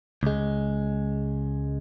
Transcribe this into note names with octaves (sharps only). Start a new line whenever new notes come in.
C#2 G#3